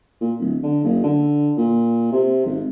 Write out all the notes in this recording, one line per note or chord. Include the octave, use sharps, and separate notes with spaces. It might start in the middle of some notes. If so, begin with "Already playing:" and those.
A#2
D1
D3
F#1
D3
A#2
C3
G#1